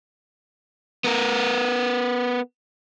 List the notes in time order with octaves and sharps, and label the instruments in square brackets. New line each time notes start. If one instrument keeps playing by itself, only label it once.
[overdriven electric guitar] B3 A#4